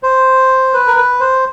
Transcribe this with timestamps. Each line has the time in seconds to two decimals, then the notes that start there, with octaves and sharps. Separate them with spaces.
0.03 C5
0.73 B4
0.87 A#4
0.97 B4
1.20 C5